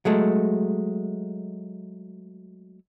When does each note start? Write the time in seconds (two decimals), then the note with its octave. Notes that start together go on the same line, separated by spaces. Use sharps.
0.05 F#3 G#3 A3